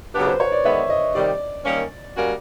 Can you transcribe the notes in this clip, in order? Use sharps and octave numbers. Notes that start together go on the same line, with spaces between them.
C#3 F#3 B3 D4 G4 B4
C5
C#5
D5
D#3 G#3 B3 E5
D#5
C3 D#3 G3 D5
D#3 G3 A#3 C#4
G3 A#3 C#4 F#4 A#4